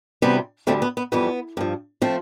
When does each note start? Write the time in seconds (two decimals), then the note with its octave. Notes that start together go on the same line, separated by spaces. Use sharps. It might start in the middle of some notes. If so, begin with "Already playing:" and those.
0.22 D2 C3 E3 G3 B3
0.67 D2 D3 G3 A3 C4
0.82 B3
0.97 B3
1.12 F2 E3 G3 B3
1.57 G2 F3
2.02 F3 A3 C4